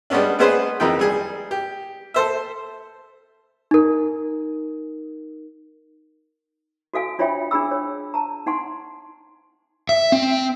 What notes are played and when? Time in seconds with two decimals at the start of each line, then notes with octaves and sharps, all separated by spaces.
0.10 G3 G#3 B3 C#4 D4
0.39 G#3 B3 C#4 G#4 B4 C5
0.80 F2 D#3 E3 G#3 G5
0.99 G3 G#4
1.51 G4
2.14 A4 C5 E5
3.71 D#4 A#4
6.94 F#4 A4 F5 G#5
7.19 D4 F4 C#5 E5 G5 B5
7.51 D4 G#4 B5 E6
7.71 C#5
8.14 A5 A#5
8.46 D#4 F#5 G#5 C6
9.89 E5
10.12 C4